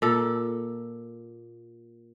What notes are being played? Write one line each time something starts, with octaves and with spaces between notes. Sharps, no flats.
A#2 A4